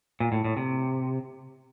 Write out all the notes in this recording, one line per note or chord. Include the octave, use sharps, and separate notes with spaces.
A#2
A2
A2
C3